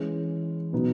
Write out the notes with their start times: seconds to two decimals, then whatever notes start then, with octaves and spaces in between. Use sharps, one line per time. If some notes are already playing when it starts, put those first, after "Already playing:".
Already playing: E3 G#3 C#4
0.73 B2 F#3 B3 D#4